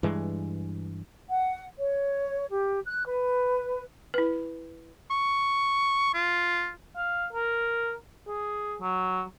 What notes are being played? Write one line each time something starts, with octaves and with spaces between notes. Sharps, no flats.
G2 E3 G#3
F#5
C#5
G4
F#6
B4
E4 B4
C#6
F4
F5
A#4
G#4
F#3